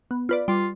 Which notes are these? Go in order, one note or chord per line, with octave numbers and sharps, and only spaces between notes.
B3
F4 B4 D5
G3 F4